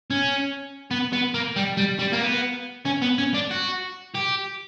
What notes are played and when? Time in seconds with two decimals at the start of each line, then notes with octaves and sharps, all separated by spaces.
0.10 C#4
0.91 B3
1.13 B3
1.34 A#3
1.56 G3
1.77 G3
1.99 G3
2.12 A#3
2.21 B3
2.86 C#4
3.02 B3
3.18 C#4
3.34 D4
3.51 F#4
4.15 G4